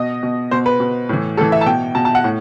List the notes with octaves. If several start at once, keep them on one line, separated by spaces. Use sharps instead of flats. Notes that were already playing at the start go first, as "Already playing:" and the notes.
Already playing: B2 D#5
B2
B2 C5
B4
B2
A2 E3
A2 E3 A4
E5
A5
B2 G5
B2 A5
A5
F#5
A2